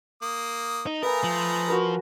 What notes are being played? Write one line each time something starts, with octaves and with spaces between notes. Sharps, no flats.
A#3 D#6
D#4
A3 A#4 B4 F5 G#5 A#5 D#6
F3
F#4 A#4 B4